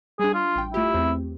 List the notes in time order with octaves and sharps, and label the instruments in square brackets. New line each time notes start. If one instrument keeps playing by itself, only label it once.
[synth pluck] G3 D4 [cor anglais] G#4
[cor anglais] F4
[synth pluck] A1 G5
[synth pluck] A3 F4 G4 [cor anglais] E4
[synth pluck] E2 C4